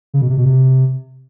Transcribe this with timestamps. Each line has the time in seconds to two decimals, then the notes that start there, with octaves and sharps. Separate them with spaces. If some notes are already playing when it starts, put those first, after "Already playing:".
0.14 C#3
0.22 B2
0.30 C3
0.37 B2
0.45 C3